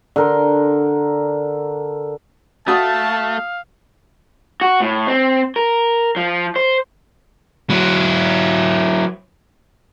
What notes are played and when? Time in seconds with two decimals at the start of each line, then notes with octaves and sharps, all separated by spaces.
0.16 D3 A#4 C6
2.68 A3 F#4 F5 A5 D#6
4.61 F#4
4.81 A2
5.08 C4
5.56 A#4
6.16 F3
6.56 C5
7.70 F#3 E4